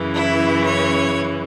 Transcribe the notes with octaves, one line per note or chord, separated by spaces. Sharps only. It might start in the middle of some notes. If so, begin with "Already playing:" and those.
Already playing: F#2 C#3 E3
E4
C#5